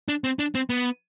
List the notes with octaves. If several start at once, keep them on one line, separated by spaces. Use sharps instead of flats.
D4
C4
D4
C4
B3